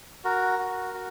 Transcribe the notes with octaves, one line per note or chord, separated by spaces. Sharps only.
F#4 A#4
F#4
F#4